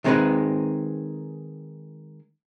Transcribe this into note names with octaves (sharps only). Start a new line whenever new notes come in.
D#3 G#3 C4 C#4 D#4 B4